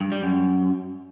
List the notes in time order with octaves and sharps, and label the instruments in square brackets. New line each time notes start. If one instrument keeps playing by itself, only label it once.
[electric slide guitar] G2
G3
F#2